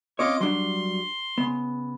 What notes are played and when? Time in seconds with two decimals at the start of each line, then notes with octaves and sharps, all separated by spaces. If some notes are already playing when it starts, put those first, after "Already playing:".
0.19 C4 C#4 F4 C#5 D#5 D6
0.40 F#3 G3 D4 C6
1.38 C#3 B3